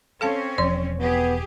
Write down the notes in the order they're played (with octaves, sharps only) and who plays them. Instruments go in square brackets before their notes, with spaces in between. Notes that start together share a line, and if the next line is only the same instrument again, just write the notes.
[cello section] C4 C#4 C#5 [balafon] A4 F5 A5
[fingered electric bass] E1 [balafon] F3 D5
[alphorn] B3 [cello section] G4 G#4